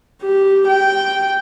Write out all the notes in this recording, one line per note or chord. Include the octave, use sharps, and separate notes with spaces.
G4
G5